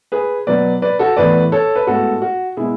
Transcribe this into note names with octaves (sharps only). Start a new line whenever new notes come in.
G#4 B4
B2 F#3 B3 B4 D5
B4 D5
F#4 A4
A2 E3 B3 B4 D5
A4 C#5
B4
A2 G#3 B3 F#4 A4
F#4
B2 G#3 B3 E4 G#4